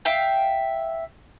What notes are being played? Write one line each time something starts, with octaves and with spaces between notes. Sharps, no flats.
E5 F5 G5